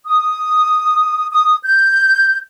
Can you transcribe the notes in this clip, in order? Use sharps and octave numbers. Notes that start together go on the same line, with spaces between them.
D#6
D#6
G6